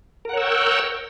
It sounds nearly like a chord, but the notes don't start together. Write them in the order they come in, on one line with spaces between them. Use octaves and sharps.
A#4 F#5 C#5 E6 G5